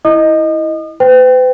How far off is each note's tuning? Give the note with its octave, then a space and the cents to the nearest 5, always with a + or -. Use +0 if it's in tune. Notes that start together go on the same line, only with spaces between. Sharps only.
E4 -10 D#5 +0 D#6 -40
B4 +45 G5 +0